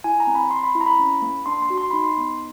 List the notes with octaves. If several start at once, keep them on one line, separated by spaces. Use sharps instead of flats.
E4 G#5
A#5
C4
B5
C4 C6
B5
E4
A#5
B5
C#4
A#3
D4 C6
C6
F#4
C6
D#4 B5
C6
B3